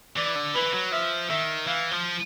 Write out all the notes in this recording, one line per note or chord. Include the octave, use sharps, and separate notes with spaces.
E3 D5
D3
E3 B4
F#3
F3 E5
D#3 E5
E3 F5
F3